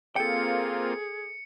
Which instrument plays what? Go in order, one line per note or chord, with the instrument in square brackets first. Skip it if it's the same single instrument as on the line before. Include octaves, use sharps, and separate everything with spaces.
[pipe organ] A#3 C4 F4 [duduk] G#4 [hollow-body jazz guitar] A4 G5 [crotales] C#7